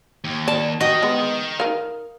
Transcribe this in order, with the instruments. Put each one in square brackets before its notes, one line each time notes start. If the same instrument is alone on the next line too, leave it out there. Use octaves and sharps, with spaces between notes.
[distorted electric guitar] D#2
[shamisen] D5 [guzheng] A5
[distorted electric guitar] D#4 G5 [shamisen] F#4 [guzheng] D#5
[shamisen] G#3 B3
A#4 F5